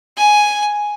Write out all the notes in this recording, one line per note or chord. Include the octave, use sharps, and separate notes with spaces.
G#5